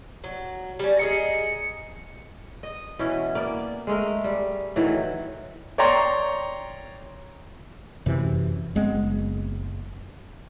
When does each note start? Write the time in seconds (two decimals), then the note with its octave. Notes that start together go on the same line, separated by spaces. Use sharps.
0.24 F#3
0.79 G3 C#4
0.99 G#4 D#5 A#5 C#7
2.63 D#5
2.99 B2 E3 C#4
3.35 A#3 B3 D5
3.87 G#3 A3 A#4
4.24 G3
4.76 A2 D#3 E3 F#3
5.78 C#5 D5 G5 A#5 C6
8.06 F1 F#2 C3 E3
8.75 F#1 G#3 B3 C4